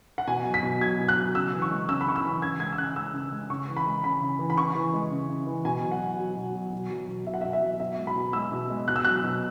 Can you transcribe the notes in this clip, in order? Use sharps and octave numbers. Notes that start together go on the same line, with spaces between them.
F#5
B2 G#5
F#3
B6
B2
F#3 G#6
B2
F#6
F#3
C#3 E6
E3
C#6
G#3
C#3 E6
B5
C#3 C#6
E6
E3
C#3 G#6
G#3 G#6
E6
C#3 F#6
G#3 E6
C#3
G#3
C#3 C#6
E3
B5
G#3
C#3 B5
C#3
E3
B5
C#3 C#6
E3
G#3
C#3
C#3
E3
B2 G#5
F#3
F#5
B2
F#3
B2
F#3
B2
F#3
B2
F#3 E5
F#5
E5
B2
E5
F#3
B2 E5
G#3
B5
B2
G#3 E6
B2
G#3
B2 F#6
E6
F#3 F#6
B2